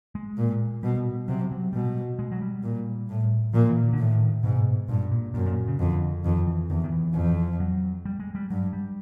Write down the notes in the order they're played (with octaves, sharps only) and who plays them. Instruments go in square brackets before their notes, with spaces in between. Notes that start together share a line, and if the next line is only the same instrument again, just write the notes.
[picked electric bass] G#3
[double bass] A#2
[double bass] B2 [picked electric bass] G3
[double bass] C3 [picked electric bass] F#3
[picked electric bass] F#3
[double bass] B2 [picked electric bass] G3
[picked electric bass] G#3
F#3
G3
[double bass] A#2
A2
[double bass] A#2 [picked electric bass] F3
[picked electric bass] E3
D#3
D3
[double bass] A2 [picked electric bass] D#3
[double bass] G#2 [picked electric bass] B2
[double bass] G2 [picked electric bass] A#2
[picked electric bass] A#2
[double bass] F#2 [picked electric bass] A#2
[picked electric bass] A#2
C#3
[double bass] F2 [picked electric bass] D3
[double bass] F2 [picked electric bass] D#3
[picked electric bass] E3
[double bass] E2 [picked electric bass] D#3
[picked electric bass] D#3
E3
[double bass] F2
[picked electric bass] F#3
G3
G#3
G3
[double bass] G2 [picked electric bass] F#3
[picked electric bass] G3